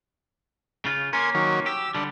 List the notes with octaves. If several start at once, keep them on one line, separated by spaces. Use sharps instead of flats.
C#3 F4
A#3 C#4 A#4 G#5 C6
D#3 F#3
G4 E6
D3 G3 D4